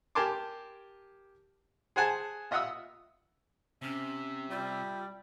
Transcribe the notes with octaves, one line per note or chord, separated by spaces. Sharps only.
G4 A#4 G#5 A5 C6 D6
G#4 C5 F#5 G#5 A5
F4 D#5 E5 F#5 D#6 E6
C3 C#4 E5
G3 F4